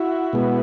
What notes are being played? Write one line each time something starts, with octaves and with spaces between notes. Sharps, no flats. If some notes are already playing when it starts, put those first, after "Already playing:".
Already playing: E4 F#4
B2 G#3 B3